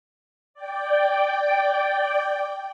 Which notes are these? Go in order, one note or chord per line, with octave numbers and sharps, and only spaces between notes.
D5 G5